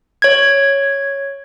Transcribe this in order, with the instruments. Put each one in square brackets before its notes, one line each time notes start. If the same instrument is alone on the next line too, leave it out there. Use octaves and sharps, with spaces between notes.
[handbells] C#5 G#6